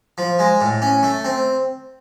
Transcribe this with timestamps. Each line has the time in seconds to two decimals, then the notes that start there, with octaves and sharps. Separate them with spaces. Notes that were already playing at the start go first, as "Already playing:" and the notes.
0.18 F3
0.39 G#3
0.61 A2
0.82 C#4
1.03 A3
1.25 C4